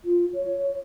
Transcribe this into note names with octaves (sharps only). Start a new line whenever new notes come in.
F4
C#5